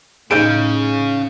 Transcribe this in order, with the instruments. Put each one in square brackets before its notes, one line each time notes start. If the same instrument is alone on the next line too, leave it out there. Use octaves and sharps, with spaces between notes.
[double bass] A2 [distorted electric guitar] C#3 [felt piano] D#4 G6 D7 [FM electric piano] G#4